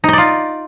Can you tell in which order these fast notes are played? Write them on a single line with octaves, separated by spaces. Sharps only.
D#4 D#5 D5 F4